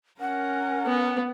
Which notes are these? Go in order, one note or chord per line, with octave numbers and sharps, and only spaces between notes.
C#4 A#4 F#5
B3